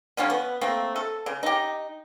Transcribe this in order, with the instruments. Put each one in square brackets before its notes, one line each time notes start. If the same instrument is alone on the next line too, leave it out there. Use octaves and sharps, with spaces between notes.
[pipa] D3 F3 G3 C#4
B3
A3 A#3 C4
A4
C#3
D#4 G4